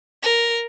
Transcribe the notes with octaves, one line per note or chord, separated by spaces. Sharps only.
A#4